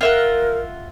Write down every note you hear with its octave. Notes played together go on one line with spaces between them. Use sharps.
F4 A#4 E5 F#5